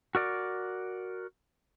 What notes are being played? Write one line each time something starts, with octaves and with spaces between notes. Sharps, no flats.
F#4 A#4 D5